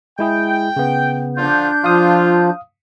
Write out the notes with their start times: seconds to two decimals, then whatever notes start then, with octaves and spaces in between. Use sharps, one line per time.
0.19 G#3 E4 G#4 G5
0.76 C#3 B3
1.36 D3 F3 D4 F4 G6
1.84 F3 F4 F5 D#6